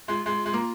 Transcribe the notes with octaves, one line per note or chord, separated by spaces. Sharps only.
G#3 F4
G#3
G#3
A#3